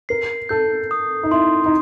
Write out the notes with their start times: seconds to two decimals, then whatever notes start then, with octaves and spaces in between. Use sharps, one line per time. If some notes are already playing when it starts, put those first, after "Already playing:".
0.09 A#4 C7
0.49 A4 G6
0.91 D#6
1.23 D#4
1.31 E4 C6
1.66 D#4